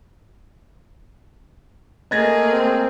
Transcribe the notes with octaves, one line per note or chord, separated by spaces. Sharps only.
A3 A#3 G#4 D#5 G#6 A#6
C4